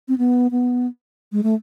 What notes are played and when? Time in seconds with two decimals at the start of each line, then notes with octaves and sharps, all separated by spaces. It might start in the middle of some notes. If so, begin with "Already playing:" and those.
0.08 C4
0.18 B3
0.51 B3
1.32 G#3
1.43 A3